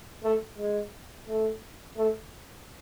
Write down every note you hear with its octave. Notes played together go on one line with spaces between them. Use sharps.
A3
G#3
A3
A3